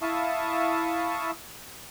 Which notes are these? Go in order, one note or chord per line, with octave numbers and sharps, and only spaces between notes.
E4 E5 F5 A5 C#6 D#6